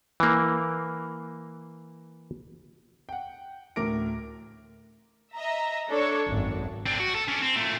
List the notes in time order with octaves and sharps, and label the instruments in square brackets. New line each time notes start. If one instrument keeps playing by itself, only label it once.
[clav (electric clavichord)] E3 A#3
[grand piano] F#5 G5
D2 A2 A#4 D6 A#6 D7
[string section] D#5 E5 A#5
D4 A4 C#5
G#1 F#2
[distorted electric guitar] C4 D4
F#4
A4
C#4 D4
C4
A#2 A3